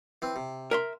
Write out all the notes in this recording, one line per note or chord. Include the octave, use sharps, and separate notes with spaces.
E3 C4
C3
A#4 E5 C6